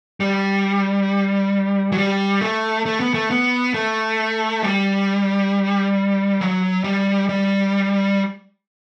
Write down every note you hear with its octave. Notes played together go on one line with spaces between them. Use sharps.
G3
F#3
G3
A3
A3
B3
A3
B3
A3
G3
F#3
G3
G3